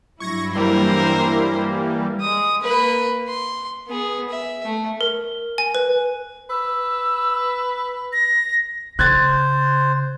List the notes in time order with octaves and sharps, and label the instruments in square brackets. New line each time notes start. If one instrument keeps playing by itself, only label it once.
[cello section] G2 F#3 E4 [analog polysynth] C#6 G#6 A#6
[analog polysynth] E3 G3 A#3 [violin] A#4 C5
[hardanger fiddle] G#3 D#6
A#3 B4
C6
B3 G#4
E5
A3
[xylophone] A#4
G#5
B4
[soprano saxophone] B4 [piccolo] E6
[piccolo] A#6
[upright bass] C#3 [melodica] C5 [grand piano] F#6 G#6 A6